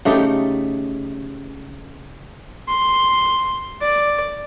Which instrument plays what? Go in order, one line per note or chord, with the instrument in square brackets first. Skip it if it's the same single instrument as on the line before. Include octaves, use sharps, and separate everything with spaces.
[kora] C#3 A3 D#4 G4
[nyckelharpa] C6
D5